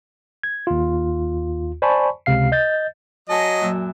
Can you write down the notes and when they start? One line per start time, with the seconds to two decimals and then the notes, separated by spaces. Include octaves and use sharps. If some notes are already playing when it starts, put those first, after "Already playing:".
0.43 G#6
0.67 D#2 F4
1.82 C5 D5 G#5 A5 B5 C#6
2.26 C#2 C3 F5 C7
2.52 D#5 G6 A6
3.29 F#3 A#4 D#5 G#5 A5
3.61 F#2 A#2 E5